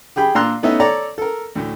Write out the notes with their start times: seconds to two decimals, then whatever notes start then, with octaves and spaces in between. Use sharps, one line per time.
0.16 G4 G#4 G5 B5
0.35 A#2 D4 A#5 C6 E6 F#6
0.63 A3 B3 C#4 D#4 E5
0.80 A4 C#5 D5 A#5
1.18 A4 A#4
1.55 D2 A2